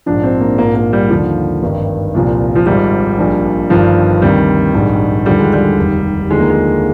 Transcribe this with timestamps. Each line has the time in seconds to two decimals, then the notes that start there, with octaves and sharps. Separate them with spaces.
0.06 A#1 G#2 F3 D4
0.23 C4
0.40 A#3
0.58 A#1 G#2 F3 A#3
0.76 A#3
0.93 G3
1.10 D#2 D3 F3
1.62 G#1 G2 D#3
2.14 C2 A#2 F3
2.55 F3
2.66 G#1 G#2 F3 G3
3.18 A#1 A#2 F3
3.70 G1 G2 D#3 F3
4.22 D2 C3 D#3 G3
4.74 A#1 G#2 D#3
5.26 D#2 D3 F3 G3
5.39 G#3
5.53 G3
5.78 F1 D#2 D#3
6.30 D#2 D3 F3 G#3
6.40 A#3
6.50 G#3